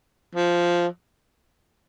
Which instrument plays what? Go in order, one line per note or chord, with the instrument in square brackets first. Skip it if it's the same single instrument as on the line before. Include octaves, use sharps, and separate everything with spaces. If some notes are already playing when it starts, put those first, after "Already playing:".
[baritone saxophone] F3